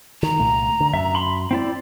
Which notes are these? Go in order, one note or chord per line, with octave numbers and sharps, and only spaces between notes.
D#3 A#5
C2 A#2 A3
D3
F#2 E5
B5 C6
C4 E4 D5